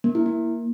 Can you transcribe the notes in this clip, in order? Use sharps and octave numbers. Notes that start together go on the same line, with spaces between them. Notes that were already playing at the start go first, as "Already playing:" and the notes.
A#3
E4
A#3